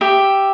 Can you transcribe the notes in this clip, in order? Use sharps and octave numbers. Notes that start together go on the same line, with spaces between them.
G4 E5